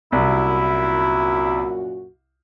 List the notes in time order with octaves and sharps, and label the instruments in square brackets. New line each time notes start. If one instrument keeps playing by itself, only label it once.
[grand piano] C2 [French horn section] F#2 A#2 F#4 [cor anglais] E4